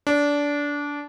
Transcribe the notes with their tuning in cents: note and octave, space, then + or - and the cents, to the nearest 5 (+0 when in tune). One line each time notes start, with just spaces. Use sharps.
D4 -20